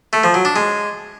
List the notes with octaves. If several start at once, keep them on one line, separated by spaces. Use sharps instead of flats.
A3
F3
F#3
D4
G#3